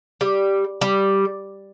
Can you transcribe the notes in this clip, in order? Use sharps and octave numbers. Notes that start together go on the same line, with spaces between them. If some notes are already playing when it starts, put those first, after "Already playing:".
G3
G3